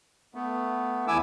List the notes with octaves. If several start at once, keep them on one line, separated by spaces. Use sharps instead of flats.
A3 B3
E2 E4 G#5 D6 E6